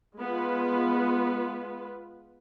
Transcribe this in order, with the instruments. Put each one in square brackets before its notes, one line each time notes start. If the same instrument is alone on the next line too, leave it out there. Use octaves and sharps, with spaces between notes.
[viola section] G#3 B3 F4 B4